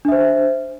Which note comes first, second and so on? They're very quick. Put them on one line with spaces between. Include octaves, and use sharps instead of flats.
D4 E5 C5